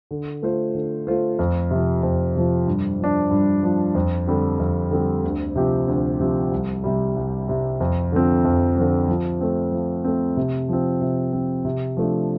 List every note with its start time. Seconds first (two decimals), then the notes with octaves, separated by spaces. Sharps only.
0.11 D3
0.43 A3 F4 C5
0.75 D3
1.07 A3 F4 C5
1.39 F2
1.71 C3 F3
2.03 F2
2.35 C3 F3
2.67 G2
2.99 F3 D4
3.31 G2
3.63 F3 D4
3.95 F2
4.27 D3 G3 C4 G4
4.60 F2
4.91 D3 G3 C4 G4
5.24 D2
5.56 C3 F3 C4 G4
5.88 D2
6.20 C3 F3 C4 G4
6.51 C2
6.84 C3 G3
7.16 C2
7.48 C3 G3
7.80 F2
8.12 D3 F3 C4
8.45 F2
8.77 D3 F3 C4
9.08 F3
9.41 A3 C4
9.72 F3
10.04 A3 C4
10.37 C3
10.69 F3 C4
11.01 C3
11.33 F3 C4
11.65 C3
11.97 F3 A3 D4